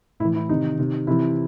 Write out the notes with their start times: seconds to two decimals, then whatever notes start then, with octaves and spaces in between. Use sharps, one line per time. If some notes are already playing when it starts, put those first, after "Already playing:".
0.20 A2 E4
0.25 E3
0.36 E4
0.49 C3 D#3 D#4
0.79 C3 D#3
1.07 C3 E3 E4